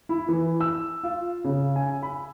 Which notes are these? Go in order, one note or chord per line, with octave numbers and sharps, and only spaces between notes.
E4
E3
E6
F4
C#3
G#5
B5